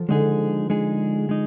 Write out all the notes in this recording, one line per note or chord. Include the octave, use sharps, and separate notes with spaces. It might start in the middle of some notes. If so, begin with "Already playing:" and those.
Already playing: F3
D3 G#3 D#4 G#4
G#3 D#4 G#4
G#3 D#4